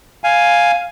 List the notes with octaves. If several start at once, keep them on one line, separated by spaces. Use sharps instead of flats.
F5 G#5